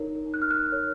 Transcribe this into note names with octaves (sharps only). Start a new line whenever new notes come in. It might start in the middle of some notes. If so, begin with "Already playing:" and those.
Already playing: D#4 A#4 C#5
D#4
F#6
F6
F#6
A#4 C#5